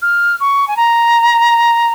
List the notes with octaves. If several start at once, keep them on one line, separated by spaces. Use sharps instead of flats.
F6
C#6
G#5
A#5